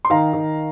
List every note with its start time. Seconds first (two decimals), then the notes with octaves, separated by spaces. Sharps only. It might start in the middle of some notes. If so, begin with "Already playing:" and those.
0.05 C6
0.10 D#3 F5 A#5
0.33 D#3